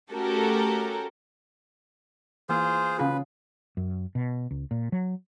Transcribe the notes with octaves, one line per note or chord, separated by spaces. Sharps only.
A3 C#4 F#4 G4 A4 A#4
E3 A#3 F4 G#4 C5
C#3 F4 G#4 B4
F#2
B2
C#2
A#2
F#3